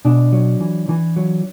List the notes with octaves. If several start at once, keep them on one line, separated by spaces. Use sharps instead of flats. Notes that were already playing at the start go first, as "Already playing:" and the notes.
B2 D4
F#3
E3
E3
F#3